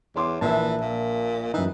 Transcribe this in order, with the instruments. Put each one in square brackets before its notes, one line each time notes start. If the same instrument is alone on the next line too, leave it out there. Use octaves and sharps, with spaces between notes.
[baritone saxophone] E2 [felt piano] C#5 C6 D6
[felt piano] A#1 A#4 [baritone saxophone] E3 [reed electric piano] E5 A5
[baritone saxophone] A#2
[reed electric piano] F#2 D#4 [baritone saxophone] E3